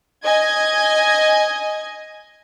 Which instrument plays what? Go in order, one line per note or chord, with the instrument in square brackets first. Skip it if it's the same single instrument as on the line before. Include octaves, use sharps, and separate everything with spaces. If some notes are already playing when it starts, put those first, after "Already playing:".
[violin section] D#5 G#5 G#6